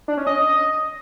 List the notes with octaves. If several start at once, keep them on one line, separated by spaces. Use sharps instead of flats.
D4
C#4
D#5